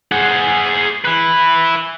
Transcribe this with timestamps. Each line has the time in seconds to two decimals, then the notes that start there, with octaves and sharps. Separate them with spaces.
0.12 G#4 F#5
1.05 E4 B4